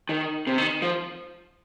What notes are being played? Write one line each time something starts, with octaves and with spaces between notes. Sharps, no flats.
D#3
C3
D#3
F3